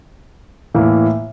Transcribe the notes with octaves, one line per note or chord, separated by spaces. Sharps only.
A2 E3 A#3 E4